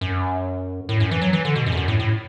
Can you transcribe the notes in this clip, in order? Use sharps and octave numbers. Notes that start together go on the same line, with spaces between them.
F#2
A2
F#2
E3
F#3
E3
D3
B2
F#2
E2
F#2
A2
A2